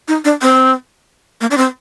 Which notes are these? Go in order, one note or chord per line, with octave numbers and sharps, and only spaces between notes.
D#4
D4
C4
A#3
D4
C4